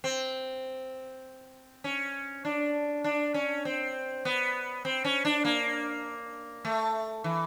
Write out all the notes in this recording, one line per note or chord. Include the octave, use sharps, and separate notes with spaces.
C4
C#4
D4
D4
C#4
C4
B3
C4
C#4
D4
A#3
A3
E3